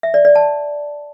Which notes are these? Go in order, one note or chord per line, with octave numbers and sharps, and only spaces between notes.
E5
D5
D5
A5